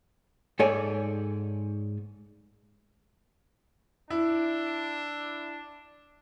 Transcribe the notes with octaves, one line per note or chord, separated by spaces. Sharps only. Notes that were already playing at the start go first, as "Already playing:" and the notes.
G#2 A4 C#5 D5 G#5
D4 E4